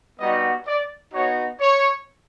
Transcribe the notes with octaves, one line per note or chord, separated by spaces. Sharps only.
G3 B3 D#4 F#4 D#5
D5
B3 D#4 F#4 C#5
C#5